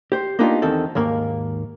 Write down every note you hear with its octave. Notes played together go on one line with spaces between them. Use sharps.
G4 C5
A#3 B3 D4 D#4 F4 G4
E2 D#3 C4 A4
D#2 G#2 A#3 A#4